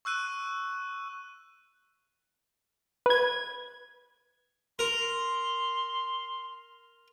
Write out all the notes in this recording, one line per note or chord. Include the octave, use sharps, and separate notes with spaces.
C#6 E6 F#6 D#7
B4 G#6
A#4 C6